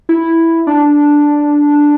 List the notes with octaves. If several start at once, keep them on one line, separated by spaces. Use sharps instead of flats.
E4
D4